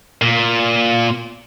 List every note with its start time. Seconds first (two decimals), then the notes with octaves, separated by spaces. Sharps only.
0.22 A#2